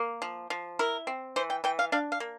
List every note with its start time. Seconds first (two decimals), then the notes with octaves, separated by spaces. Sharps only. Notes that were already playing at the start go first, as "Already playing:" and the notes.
Already playing: A#3
0.22 F3
0.50 F3
0.79 E4 A#4
1.07 C4
1.36 E3 C5
1.50 G5
1.64 E3 G5
1.79 F5
1.92 D4 F5
2.12 F5
2.20 A#3